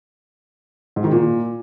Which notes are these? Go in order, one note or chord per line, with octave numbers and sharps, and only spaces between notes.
G#2
D#3
A#2